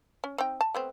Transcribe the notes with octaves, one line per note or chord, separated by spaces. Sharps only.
C#4
C4 D#4 G5
A5
A3 B3 C4